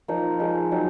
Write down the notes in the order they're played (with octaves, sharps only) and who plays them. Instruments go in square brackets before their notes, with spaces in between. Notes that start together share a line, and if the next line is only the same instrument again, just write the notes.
[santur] F3 A#3 D#4
F3 G#3 D#4
F#3 C4 D#4